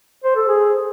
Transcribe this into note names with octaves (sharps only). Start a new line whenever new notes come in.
C5
A4
G#4